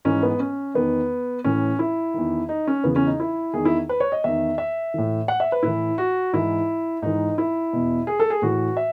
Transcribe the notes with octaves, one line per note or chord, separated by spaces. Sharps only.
G#2 E3 C#4
B3
C#4
E2 D#3 B3
A2 E3 C#4
E4
E2 D#3
D#4
C#4
E2 C#3 E3 B3
C#4
D#4
E4
E2 D#3 G#4
E4
B4
C#5
D#5
E2 D#3 E5
E5
A2 E3
F#5
E5
B4
A2 E3 E4
F#4
G#2 E3 E4
G#2 E3 D#4
E4
E2 B2
G#4
A4
G#4
A2 E3 F#4
E5